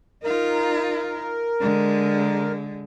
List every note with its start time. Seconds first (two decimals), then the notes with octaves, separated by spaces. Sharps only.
0.24 D#4 F4 A#4
1.60 D3 G#3